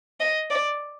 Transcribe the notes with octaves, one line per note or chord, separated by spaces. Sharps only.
D#5
D5